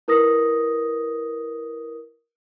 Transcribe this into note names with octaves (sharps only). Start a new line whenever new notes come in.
E4 A#4 B4 D#6 A#6